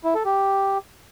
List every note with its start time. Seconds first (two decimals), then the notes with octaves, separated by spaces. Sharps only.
0.05 E4
0.15 A4
0.25 G4